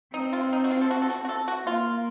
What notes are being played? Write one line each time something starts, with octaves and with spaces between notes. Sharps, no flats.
C4 D#4
F4
D#4
F#4
F4
A4
F#4
A4
F#4
F#4
A4
F#4
A#3 F4